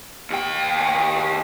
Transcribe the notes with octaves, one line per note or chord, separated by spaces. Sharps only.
D#2 G5